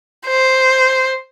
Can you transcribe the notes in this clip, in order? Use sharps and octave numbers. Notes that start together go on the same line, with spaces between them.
C5